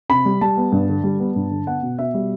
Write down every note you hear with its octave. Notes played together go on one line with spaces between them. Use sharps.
C3 B5
G3
G3 A5
B3
G2
D3
G3
B3
G2
D3
B3 F#5
B2
B2 E5
G3